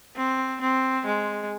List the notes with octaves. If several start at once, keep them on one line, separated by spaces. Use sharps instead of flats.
C4
C4
G#3